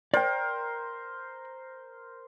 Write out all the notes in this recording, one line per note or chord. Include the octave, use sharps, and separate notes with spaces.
A#4 C5 D5 G5